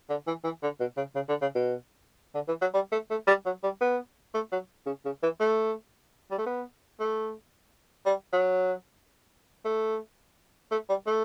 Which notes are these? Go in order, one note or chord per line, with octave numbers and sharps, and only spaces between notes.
D3
E3
E3
D3
B2
C#3
C#3
D3
C#3
B2
D3
E3
F#3
G3
A3
A3
G3
F#3
G3
B3
A3
F#3
C#3
C#3
E3
A3
G3
A3
B3
A3
G3
F#3
A3
A3
G3
A3